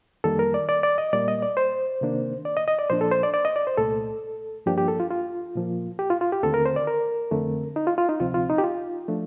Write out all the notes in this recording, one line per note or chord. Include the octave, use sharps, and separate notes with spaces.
F2 D#3 G3 A#3 A4
A#4
D5
D5
D5
D#5
A#2 G3 A#3 D5
D#5
D5
C5
C3 D#3 A#3 D4
D5
D#5
D#5
D5
A#2 F3 A#3 D4 C5
A4
C5
D5
D5
D#5
D5
C5
C2 A#2 A3 A4
G2 F3 A#3 D4 G4
G4
A4
F4
F4
A#2 F3 A#3
G4
F4
F4
G4
D#2 D3 A3 C4 A4
A#4
C5
D5
A#4
F2 D3 A3 C4
D#4
F4
F4
D#4
D2 C3 F3 C4 F4
F4
D#4
G4
F4
F3 A3 D4